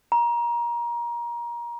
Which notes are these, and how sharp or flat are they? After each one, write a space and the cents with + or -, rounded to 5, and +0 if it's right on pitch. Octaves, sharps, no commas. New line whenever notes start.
A#5 +25